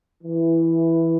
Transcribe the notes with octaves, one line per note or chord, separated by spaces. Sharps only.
E3